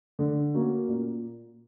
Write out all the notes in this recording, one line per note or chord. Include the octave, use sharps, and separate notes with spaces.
D3
A#3 C#4 F#4
A#2